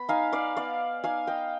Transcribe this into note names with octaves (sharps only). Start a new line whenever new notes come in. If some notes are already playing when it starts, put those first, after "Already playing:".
Already playing: B3 B5
D#4 F5 G#5
D5 F5
B3 D5 F5
D#4 F5 G#5
D#5 G5